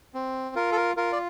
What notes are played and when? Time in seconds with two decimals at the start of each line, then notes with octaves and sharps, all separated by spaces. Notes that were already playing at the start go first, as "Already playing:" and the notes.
0.14 C4
0.56 F4 A#4
0.72 A4
0.77 A#4
0.97 F4 A#4
1.12 D5